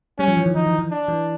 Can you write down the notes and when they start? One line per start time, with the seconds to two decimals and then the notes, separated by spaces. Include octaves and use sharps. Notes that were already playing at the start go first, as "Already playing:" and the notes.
0.19 G3 C#4
0.28 F3
0.37 E3
0.46 D#3
0.55 E3 D#4
0.66 E3
0.79 E3
0.91 D4
1.08 E3